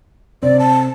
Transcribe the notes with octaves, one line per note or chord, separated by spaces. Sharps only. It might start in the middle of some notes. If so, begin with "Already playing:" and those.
C3 C4 D5
A5